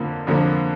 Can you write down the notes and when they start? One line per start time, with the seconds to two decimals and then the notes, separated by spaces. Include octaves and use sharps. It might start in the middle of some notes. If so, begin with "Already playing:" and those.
Already playing: F2 D3 F3 A#3
0.27 F2 D3 F3 A#3